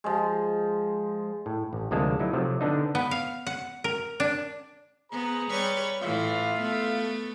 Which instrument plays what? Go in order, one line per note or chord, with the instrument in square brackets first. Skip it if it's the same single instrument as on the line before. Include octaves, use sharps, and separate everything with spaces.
[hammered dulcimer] F3 G#3
[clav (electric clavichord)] A2
A1
D2 C3 F3 G#3 A#3 A5
F#3 D#4 E4
C3 F3 F#3 A3
D3 B3 D4 D#4
[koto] B3
F5
F#5
A#4
D4
[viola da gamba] B3 [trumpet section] G#4 C5 A#5
[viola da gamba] G3 B4 C#5
[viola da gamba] A2 E3 [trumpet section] F4 E5 F5
[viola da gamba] A3 B3